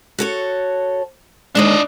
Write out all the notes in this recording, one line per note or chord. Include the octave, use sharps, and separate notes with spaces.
F#4 A4 C#5
D#2 D3 G#3 D4 D#5